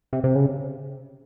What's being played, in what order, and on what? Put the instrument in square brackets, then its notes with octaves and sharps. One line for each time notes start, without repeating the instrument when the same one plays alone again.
[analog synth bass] C3
C3
C#3